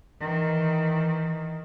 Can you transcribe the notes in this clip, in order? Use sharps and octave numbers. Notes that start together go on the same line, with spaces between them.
D#3 E3